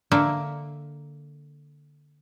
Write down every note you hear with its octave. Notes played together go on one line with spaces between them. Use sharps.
D3 A#3 E5